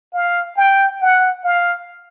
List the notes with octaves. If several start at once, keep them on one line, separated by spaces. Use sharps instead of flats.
F5
G5
F#5
F5